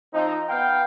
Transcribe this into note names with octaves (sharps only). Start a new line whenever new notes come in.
F3 C4 D#4
B3 F5 G5